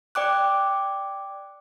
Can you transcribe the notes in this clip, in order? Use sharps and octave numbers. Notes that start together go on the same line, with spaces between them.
D5 G5 D6 F#6